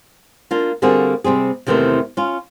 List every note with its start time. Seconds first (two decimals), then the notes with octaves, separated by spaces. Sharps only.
0.51 A#3 D4 F4
0.82 D3 G3 A#3 C4 F#4 G#4
1.24 C3 G3 C4 G#4
1.67 E2 C3 D#3 E3 A3 C4
2.17 C#4 F4